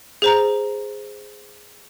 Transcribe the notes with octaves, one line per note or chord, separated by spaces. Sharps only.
G#4 C5 A#5